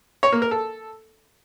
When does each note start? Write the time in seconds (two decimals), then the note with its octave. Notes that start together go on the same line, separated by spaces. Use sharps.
0.23 C#5
0.32 A#3
0.42 A#4
0.51 A4